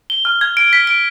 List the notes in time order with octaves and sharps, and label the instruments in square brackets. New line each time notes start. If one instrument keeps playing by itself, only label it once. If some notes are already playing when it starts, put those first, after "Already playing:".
[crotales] G7
F6
G#6
D7
B6
D7